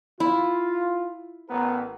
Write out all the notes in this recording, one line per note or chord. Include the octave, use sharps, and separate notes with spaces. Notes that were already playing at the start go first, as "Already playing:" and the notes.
E4 F4
A1 B3 A#4